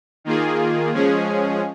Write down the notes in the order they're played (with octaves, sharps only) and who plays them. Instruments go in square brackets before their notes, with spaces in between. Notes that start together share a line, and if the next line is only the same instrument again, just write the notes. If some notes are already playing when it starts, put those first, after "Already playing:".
[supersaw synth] D#3 A#3 F4 G#4
F3 G#3 C#4 G#4